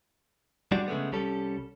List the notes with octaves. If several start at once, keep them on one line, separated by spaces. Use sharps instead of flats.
G3 G#3 D4 F#4 D5
C#3 G#3 A3 B3
C2 G3 C#4 A4